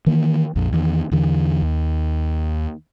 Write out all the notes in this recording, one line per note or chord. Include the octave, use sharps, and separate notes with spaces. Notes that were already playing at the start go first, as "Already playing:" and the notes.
D#3 E3 A#3
A#1 F2
E2 D#3
E2 D3 E3
D#2